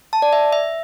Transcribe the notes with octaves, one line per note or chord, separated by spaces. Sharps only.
A5
D5
E5
E5